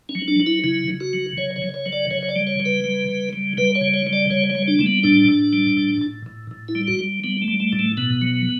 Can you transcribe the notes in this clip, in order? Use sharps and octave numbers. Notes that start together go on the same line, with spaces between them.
C#4
F#3
D4
F#3
E4
C#3 E4
C#3
F#4
F#3
C#3 C#5
C#5
C#3
C#5
F#3
D5
C#3 C#5
C#5
D5
G3
C#5
C#3
B4
G3
C#3
G3
G3 B4
C#5
C#3
C#5
G3
D5
C#3 C#5
C#5
G3
D4
G3 A3
B3
A2 D4
A2
G3
A2
A2
A2
A2
E4
G3
F#4
G3
G3 B3
A3
G3
A3
A2
A3
B2 B3
F#3